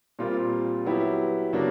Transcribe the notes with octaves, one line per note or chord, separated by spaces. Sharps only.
A#2 G3 C4 F4 A#4
F#3 B3 E4 G4
C#3 F#3 A#3 D4